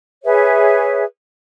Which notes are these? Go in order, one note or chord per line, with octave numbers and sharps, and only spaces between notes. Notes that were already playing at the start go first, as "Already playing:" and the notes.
G#4 B4 C#5 E5